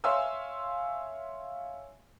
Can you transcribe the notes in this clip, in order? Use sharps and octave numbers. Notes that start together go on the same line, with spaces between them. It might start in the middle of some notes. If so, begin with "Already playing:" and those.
C#5 E5 F5 G#5 C6 E6